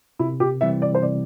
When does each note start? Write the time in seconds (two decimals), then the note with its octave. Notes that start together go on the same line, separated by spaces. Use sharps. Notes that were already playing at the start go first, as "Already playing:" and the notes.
0.19 C3 E4
0.40 G4
0.61 E3 G3 C4 E4 E5
0.82 D5
0.95 C5
1.02 C3 D5